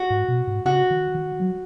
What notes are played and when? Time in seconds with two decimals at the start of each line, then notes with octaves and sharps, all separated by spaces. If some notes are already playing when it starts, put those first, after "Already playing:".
Already playing: F#4
0.10 G#2
0.28 B2
0.47 G#2
0.65 C#3 F#4
0.91 D#3
1.15 D#3
1.40 F#3